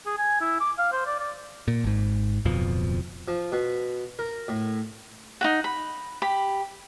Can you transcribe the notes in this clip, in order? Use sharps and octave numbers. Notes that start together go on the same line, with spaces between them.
G#4
G#5
E4
D6
F5
C5
D5
D5
A#2
G#1 G#2
D1 F2 B2 F3
F3
B2
A#4
A2
D#4 F#4 F#5
B5
G4 B5